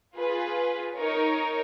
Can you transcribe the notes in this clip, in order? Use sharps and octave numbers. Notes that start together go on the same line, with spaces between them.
F4 G#4 B4
D#4 A#4 C#5